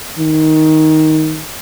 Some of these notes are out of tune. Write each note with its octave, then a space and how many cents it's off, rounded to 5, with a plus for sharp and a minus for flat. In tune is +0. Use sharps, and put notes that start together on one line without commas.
D#3 +10